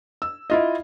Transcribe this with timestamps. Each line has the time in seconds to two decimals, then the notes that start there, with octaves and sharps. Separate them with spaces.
0.22 E6
0.50 E4 F4 D#5